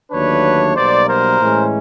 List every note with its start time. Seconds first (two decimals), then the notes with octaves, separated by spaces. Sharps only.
0.11 D#2 D3 F#3 A3 D4 B4 C#5
0.75 B1 B2 G3 A#3 C5 D5
1.08 A#4 C5
1.40 A2 E3 G#3 C#4